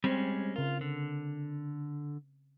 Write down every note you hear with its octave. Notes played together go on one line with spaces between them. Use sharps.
G3 G#3 C4 C#4
C#3 F4 A#4
D3